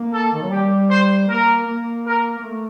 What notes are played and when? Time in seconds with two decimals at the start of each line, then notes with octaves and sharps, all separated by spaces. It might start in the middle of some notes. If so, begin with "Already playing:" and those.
Already playing: A#3
0.12 A4
0.33 D#3
0.42 F#3
0.50 G3 G4
0.89 C5
1.29 A#3 A#4
1.66 A#3
2.05 A#4
2.38 A#3
2.44 A3